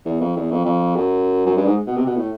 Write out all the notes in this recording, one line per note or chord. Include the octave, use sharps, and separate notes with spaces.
E2
F2
E2
F2
F2
F#2
F#2
G2
G#2
B2
C3
B2
A2